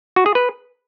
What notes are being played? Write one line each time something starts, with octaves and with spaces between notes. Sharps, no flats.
F#4
G#4
B4